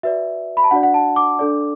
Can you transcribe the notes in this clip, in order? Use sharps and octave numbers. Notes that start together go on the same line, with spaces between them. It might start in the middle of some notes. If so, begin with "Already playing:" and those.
F#4 B4 D5 E5
B5
A5
D4 F#4 D5 F#5
F#5
A5
D6
D4 A4 D5